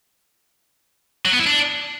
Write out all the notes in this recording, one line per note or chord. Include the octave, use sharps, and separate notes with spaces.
F#3
B3
E4
D4